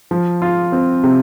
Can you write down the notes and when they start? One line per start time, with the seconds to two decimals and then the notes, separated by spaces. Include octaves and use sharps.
0.11 F3
0.42 F4
0.72 C4
1.04 C3